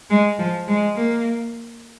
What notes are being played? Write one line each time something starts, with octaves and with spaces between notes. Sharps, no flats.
G#3
F3
G#3
A#3